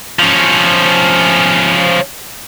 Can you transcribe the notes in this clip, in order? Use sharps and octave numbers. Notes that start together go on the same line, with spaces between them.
F3 C#4